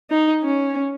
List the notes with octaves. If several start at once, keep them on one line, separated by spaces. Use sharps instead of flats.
D#4
C#4